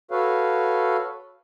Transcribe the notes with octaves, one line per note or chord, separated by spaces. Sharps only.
F#4 A4 B4 C#5 F5